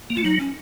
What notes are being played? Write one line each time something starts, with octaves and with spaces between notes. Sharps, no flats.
A#3
A3 F4
F#3 D#4
C#4